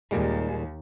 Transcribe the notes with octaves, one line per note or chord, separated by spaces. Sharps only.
D#2 A#2 G3 G#3